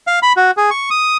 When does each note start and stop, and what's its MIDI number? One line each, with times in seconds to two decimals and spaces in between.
0.07 0.19 77
0.23 0.33 83
0.37 0.51 66
0.57 0.70 68
0.71 0.90 85
0.90 1.17 87